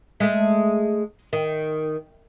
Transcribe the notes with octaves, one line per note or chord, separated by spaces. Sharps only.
G#3 A3
D#3